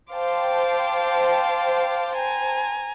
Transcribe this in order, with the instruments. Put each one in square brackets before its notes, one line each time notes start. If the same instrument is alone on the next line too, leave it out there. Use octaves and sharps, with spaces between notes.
[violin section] C5 G5 A5 [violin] F5 D6
[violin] G#5 A#5